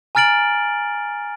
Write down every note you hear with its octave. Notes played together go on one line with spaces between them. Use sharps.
G#5 A#5 F6 A6 D7 F#7